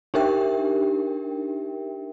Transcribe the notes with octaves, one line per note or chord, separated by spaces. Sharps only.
D4 D#4 G4 A#4 E5 G5